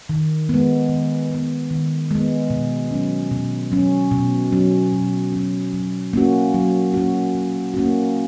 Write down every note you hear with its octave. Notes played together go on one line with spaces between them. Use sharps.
D#3
G#3 B3
D#3
G#3 B3
D#3
G#3 B3
B2
F#3 C#4
B2
F#3 C#4
B2
F#3 C#4
B2
F#3 C#4
F#3
A#3 C#4 F#4
F#3
A#3 C#4 F#4
F#3
A#3 C#4 F#4